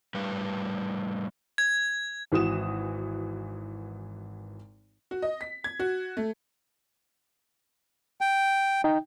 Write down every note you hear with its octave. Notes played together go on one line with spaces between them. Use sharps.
A2 G3 B4
G#6
G#1 E3 F#4 D#6 E7
F#4
D#5
B6
G#6
F#4
A3
G5
D#4 G5